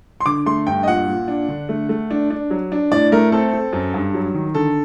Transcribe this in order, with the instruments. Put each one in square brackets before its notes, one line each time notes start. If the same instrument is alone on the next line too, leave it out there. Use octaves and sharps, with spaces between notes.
[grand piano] C6
D3 D6
A3 C6
G2 G5
D#5
A#2 F#5
A#2
D4
D3
A3
A3
D4
D4
F#3
D4
A2 D5
A3 A#4
C4 A4
C4
F#2
G2
F#3
D#3
D3 A4